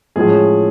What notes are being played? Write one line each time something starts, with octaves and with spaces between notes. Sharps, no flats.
A2 F3 G#3 C#4 G#4